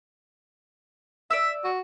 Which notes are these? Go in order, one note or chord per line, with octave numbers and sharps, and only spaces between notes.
D5 E5 E6
F#4